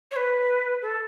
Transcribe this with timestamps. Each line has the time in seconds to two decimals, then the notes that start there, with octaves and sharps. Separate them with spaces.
0.11 C#5
0.16 B4
0.82 A4